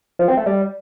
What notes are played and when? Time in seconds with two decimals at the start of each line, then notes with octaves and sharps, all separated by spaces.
0.19 F3
0.28 C4
0.37 A3
0.46 G3